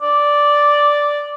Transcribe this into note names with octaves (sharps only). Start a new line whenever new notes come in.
D5